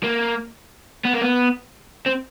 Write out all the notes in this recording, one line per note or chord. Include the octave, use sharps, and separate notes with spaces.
A#3
B3
A#3
B3
C4